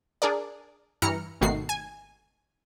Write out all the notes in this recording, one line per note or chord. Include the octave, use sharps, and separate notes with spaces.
D4 G#4 A#4 D5
G2 E3 E4 A#5 F6 C#7
G#1 B2 D#3 A3 F#4 C7
G#5